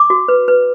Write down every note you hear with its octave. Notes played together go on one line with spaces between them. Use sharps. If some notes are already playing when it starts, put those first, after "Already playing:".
Already playing: D6
F#4
B4
B4